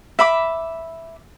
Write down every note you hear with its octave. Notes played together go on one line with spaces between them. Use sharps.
E5 B5 D6